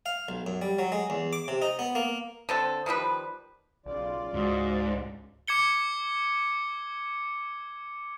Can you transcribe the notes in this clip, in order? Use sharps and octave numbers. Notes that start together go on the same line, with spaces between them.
F5
B1
F#2
G3
F#3
G#3
E2
D6
C3
D#4
B3
A#3
D3 C4 A4
D#3 F3 G3 B4
B1 C#3 F4 D5
C#2 G#2 F#4
D6 G#6 C#7 G7